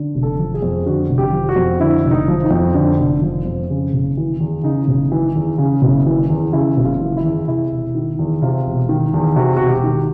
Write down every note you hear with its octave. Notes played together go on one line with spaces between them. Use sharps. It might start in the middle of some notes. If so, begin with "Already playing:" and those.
Already playing: D3
F1
A4
F3
G#4
F2
D3 F#4
F1
G4
F3
F#4
F2
D3 E4
F1
D#4
F3
D#4
F2
D3
F1
F3
F2
C#3
F#1
E3
E2
C#3 D#4
F#1
E3
E2
C#3
F#1
E3
E2
C#3 E4
F#1
F4
E3
E4
E2
C3 E4
E1
D#3
E2
C3 F4
E1
D#3
E2
C3 F#4
E1 F#4
G4
D#3